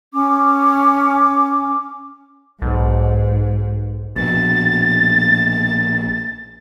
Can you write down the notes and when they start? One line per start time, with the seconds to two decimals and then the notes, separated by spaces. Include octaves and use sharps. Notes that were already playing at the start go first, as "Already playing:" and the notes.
0.13 C#4 D6
2.62 B1 G#2
4.16 A#1 B2 A6